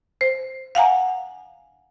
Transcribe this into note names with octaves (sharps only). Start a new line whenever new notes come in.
C5
F5 F#5 G#5 A#5